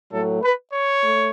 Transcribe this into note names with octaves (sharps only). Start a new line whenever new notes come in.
A2 F#3 A3 A4
B4
C#5
A3